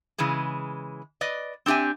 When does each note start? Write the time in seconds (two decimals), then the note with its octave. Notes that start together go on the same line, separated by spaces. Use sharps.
0.18 C#3 E3 G#3 G#4
1.21 B4 D5 D#5
1.66 C4 D4 G4 E5 G#5